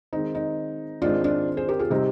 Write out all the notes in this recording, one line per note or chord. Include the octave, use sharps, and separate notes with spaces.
D#3 G#3 C4 D#4
D#4
G#2 D#3 G#3 C4 D4 F4
D4 F4
G#4 C5
G4 A#4
F4 G#4
C3 G3 C4 D#4 G4